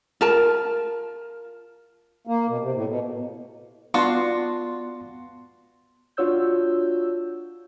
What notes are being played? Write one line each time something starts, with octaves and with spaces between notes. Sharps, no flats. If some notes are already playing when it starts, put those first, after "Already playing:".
F4 A#4 A5
A#3
B2
C3
A2
B2
B3 D4 F4 F#4 C6
D4 F4 F#4 C#5 E6 G6